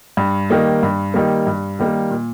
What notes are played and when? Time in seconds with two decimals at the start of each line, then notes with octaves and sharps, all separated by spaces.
0.17 G2
0.50 D#3 G3 A#3
0.83 G2
1.14 D#3 G3 A#3
1.47 G2
1.79 D#3 G3 A#3
2.11 A#2